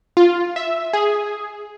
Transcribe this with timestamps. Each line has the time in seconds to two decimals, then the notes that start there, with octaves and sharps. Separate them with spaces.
0.17 F4
0.56 E5
0.93 G#4